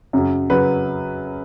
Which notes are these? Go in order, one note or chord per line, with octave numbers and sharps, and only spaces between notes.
F#2 C#3 F#3
C#3 F#3 B4